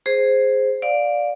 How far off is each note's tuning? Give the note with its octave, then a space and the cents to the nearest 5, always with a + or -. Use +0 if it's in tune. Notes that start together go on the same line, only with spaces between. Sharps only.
G#4 +0 C5 +0
D5 +0 F5 +20